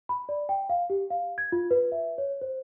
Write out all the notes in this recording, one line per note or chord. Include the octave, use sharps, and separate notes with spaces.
B5
D5
G5
F5
G4
F5
G#6
F4
B4
E5
C#5
C5